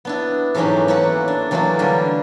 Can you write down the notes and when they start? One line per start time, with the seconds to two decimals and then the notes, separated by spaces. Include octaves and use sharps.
0.05 B3 D4 E4
0.55 G#2 E3 F#3 A3 C#4 G4
0.88 A3 A#3 C#4 E4 B4 F#5
1.28 D4
1.51 E3 F#3 A3 A#3 D4 F4
1.79 D3 G3 A#3 D4 A#4